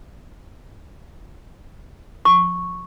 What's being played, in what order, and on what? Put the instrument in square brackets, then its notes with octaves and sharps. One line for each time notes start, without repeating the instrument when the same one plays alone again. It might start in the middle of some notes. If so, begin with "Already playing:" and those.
[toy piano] C#6